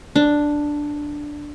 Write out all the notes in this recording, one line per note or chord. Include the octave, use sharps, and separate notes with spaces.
D4